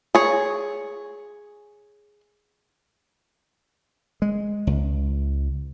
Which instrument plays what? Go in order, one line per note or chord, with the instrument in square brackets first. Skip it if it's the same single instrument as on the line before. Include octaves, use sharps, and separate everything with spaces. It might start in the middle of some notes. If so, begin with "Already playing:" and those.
[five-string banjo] G#4 C#5
[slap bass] G#3
C#2